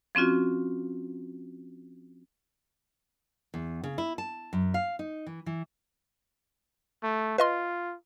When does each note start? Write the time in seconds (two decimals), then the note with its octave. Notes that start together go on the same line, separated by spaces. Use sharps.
0.15 F3 C4 C#4 F4 F#4
3.54 E2
3.84 C#3
3.98 E4
4.18 A5
4.53 F#2
4.74 F5
4.99 D#4
5.26 E3
5.46 E3
7.03 A3
7.38 F4 B4 D#5 C6